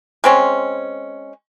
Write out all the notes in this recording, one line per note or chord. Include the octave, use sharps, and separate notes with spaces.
G#3 C4 C#4